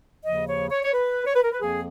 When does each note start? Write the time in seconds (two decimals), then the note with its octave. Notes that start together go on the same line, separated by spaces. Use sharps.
0.25 D#2 C#3 F3 D#5
0.48 C#5
0.71 C#5
0.84 C#5
0.93 B4
1.26 C#5
1.35 B4
1.43 A#4
1.52 B4
1.61 F2 F3 A#3 G#4